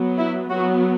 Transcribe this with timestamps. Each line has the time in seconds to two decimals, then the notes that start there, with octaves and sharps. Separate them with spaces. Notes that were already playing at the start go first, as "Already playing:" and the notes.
Already playing: F#3 B3
0.18 E4
0.50 F#3 B3 F#4